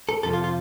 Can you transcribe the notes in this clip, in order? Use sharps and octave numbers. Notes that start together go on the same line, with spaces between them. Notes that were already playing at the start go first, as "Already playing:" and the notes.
A4
F2 C3 F3 A4
F4
F4